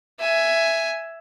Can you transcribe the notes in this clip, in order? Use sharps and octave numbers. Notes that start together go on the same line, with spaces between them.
E5 G#5